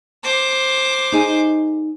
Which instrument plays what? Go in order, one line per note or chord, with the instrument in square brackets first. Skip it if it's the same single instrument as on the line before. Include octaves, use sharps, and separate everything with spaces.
[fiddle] C5 D6
[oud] D#4 G#4